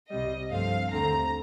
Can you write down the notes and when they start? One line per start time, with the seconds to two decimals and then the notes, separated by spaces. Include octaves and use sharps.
0.11 C2 C3 G3 D#5
0.51 G2 F3 A3 C4 F5
0.91 D#2 D3 A3 C4 A#5